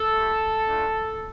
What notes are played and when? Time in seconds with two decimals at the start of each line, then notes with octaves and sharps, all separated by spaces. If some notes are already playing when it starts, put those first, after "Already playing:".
Already playing: A4
0.14 A3 E4 G4
0.65 A3 D4 F4